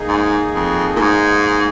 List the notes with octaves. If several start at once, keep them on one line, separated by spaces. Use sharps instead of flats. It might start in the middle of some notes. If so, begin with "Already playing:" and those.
Already playing: A#3 D#4 G#4
G#2
F2
A#2
G#2